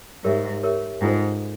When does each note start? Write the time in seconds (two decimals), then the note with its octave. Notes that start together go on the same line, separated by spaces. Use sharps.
0.24 G#2 G4 A#4 C#5 E5
0.63 G4 A#4 C#5 E5
1.01 G#2 C#4 F4 A4 C5